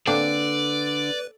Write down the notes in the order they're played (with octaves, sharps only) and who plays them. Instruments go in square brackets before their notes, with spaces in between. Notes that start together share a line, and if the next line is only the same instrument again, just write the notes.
[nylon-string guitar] D3 [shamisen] A#3 C4 D4 [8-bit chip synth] B4 [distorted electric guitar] D5